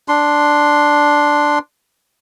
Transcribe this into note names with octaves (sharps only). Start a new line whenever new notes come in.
D4 C6